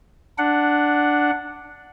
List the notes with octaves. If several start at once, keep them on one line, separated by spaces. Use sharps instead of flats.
D4 F#5